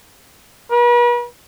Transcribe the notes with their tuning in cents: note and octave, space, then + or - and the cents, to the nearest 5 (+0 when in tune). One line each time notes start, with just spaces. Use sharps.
B4 -40